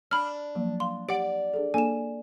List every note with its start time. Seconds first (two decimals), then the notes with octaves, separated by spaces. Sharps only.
0.11 D4 B5 F6
0.55 F3 F#3 A#3
0.80 F5 C6
1.09 G4 D5 F#5 D7
1.54 D4 G#4 A4
1.74 A#3 D4 A4 G#5 E7